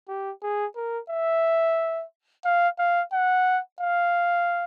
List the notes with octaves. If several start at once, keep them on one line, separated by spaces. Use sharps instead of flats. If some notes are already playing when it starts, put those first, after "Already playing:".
G4
G#4
A#4
E5
F5
F5
F#5
F5